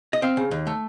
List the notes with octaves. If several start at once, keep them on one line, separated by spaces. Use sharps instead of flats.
D#5
C4 F5
C#3
D#2
A3